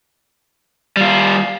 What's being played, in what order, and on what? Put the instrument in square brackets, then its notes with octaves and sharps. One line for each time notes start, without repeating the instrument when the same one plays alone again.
[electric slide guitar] G3 F4